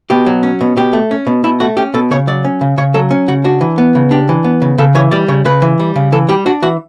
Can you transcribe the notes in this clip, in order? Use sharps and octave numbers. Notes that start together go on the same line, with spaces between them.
B2 G4
F#3
C#4
B2
B2 G4
A3
C#4
B2
B2 E4
A3 F#4
C#4 G4
B2 A4
C#3 C#5
F#3 D5
C#4
C#3
C#3 C#5
F#3 A4
C#4
C#3 F#4
D4 F#4
E3
B3
C#3
D4 G4
E3
B3
C#3
C#3 A4
E3 C#5
G3 D5
C#3 C#5
C#3 B4
E3
G3
C#3
E3 A4
G3 G4
D4 F#4
E3 F#4